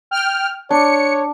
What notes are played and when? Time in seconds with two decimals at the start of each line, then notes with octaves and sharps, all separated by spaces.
0.11 G5 F6
0.71 D4 C#5 C#7